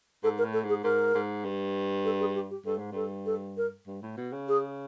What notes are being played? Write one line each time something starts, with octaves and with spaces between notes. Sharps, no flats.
G#2 A4
A#4
A2
A4
G#2
G#4
G#2 A#4
G#2
G2
A4
G#4
G4
G4
G2 A4
G#2
G2 A4
A4
A#4
G2
A2
B2
C#3
G#4